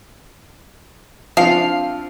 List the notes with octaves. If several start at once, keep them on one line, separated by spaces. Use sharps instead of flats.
F3 C4 D4 F5